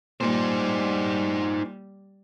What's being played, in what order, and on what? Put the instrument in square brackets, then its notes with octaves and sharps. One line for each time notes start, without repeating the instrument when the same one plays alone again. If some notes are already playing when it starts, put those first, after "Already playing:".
[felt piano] A#2 [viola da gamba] G3 [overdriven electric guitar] D#4 C5